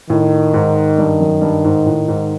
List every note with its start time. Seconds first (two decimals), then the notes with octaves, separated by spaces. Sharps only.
0.10 A2 D#3
0.54 G#2
0.99 G2
1.20 F#2
1.42 G2
1.64 G#2
1.86 A2
2.08 G#2